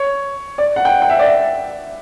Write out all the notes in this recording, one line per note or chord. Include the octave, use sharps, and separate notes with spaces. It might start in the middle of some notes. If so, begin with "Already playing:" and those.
Already playing: C#5
D5
F#5
G5
G5
E5
D5
E5